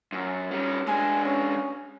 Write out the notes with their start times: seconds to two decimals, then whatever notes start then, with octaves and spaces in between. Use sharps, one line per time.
0.12 F#2
0.51 G3 C#4
0.88 G#3 D4 G#5
1.25 C#4